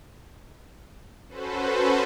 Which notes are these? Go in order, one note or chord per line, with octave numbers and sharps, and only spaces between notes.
C#4 F#4 A4 B4 C5